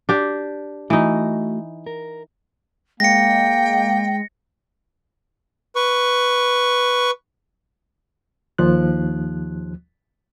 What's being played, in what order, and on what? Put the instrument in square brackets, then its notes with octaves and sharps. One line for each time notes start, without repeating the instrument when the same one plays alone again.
[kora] D4 G4
[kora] E3 D#4 [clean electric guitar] A3 F#4 D#5
[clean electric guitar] A#4
[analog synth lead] G#3 [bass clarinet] A#3 [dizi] G5 [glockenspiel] A#6 C#7
[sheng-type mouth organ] B4 C#6
[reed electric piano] D#2 F3 F#6